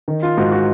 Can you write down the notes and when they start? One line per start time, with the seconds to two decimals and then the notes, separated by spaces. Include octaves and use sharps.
0.08 D#3
0.23 F4
0.37 G#2 F#4
0.52 F#4